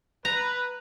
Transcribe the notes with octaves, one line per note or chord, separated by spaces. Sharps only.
B4 A#5